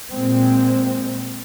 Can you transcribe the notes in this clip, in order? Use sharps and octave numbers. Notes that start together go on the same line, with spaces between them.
A#2 G#3 C4